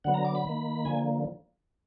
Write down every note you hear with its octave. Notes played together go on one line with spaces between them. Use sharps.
D3 F#3 B3 F#5
A#5
D6
B5
D#3 A#3
D3 F3 A#3 G#5